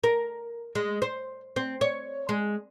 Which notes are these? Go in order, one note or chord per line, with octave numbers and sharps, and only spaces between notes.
A#4
G#3
C5
C4
C#5
G#3